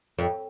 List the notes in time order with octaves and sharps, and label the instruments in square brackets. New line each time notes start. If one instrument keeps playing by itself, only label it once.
[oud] F2